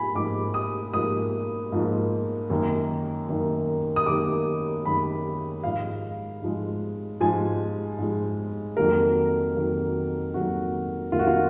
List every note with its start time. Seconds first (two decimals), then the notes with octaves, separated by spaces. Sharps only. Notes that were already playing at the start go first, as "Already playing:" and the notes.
Already playing: G#2 F3 A#3 G#5 B5
0.15 G#2 F3 A#3 D6
0.54 D#6
0.94 G#2 F3 A#3 D#6
1.72 G#2 F3 A#3
2.50 F#2 D#3 A#3
3.29 F#2 D#3 A#3
3.96 D#6
4.06 F#2 D#3 A#3 D6
4.85 F#2 D#3 A#3 B5
5.64 G#2 F3 G#3 F5
6.42 G#2 F3 G#3
7.21 G#2 F3 G#3 G#5
7.98 G#2 F3 G#3
8.77 F2 D#3 F#3 A#3 A#4
9.55 F2 D#3 F#3 A#3
10.34 F2 D#3 F#3 A#3 F#4
11.12 F2 D#3 F#3 A#3 F4
11.19 F#4
11.27 F4